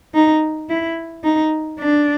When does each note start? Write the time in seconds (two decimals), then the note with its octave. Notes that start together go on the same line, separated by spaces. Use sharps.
0.15 D#4
0.69 E4
1.24 D#4
1.79 D4